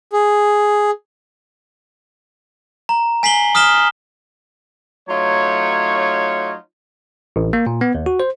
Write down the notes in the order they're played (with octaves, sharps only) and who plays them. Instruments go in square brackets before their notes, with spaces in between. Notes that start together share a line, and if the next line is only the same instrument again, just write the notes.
[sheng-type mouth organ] G#4
[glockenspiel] A#5
G#5 B6 C7 F#7 G7
D#6 F6 B6 E7 G7
[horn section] F#3 A3 D#4 F4 C#5
[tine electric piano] A1
A#3
A#2
B3
D#2
F#4
C5